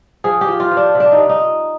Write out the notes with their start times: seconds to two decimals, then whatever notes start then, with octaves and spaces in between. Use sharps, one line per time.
0.24 F3 G#4
0.41 G4
0.48 F3
0.60 F4
0.71 F3
0.77 D4
0.95 C3
1.00 D4
1.12 D#4
1.18 C3
1.29 D#4